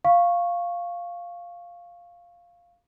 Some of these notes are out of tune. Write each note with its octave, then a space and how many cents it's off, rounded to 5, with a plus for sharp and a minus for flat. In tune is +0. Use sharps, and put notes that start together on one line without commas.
F5 +0 C#6 -10